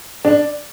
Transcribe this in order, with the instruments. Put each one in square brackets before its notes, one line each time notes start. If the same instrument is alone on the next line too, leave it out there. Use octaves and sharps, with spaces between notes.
[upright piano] D4